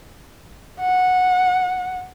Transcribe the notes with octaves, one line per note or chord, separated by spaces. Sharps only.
F#5